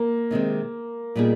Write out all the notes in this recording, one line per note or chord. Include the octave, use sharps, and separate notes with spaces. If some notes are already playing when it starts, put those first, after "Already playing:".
Already playing: A#3
C3 D#3 G#3 C4
A#2 G3 B3 D#4 G#4